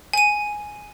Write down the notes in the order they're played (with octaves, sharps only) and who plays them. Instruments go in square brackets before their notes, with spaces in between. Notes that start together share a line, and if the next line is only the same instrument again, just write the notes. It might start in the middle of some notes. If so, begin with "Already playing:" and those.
[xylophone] G#5 D#7